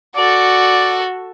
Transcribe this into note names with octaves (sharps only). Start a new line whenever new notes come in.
F#4 A4 D5